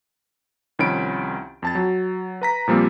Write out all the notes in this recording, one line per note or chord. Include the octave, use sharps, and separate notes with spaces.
C2 D#3 F3 C#4 B5 D7
F2 A5 A6
F#3
B4 A#5 B6
A#2 F3 G3 A#3 C4